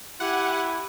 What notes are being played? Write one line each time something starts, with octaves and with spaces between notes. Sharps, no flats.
E4 G4 F#5 G#5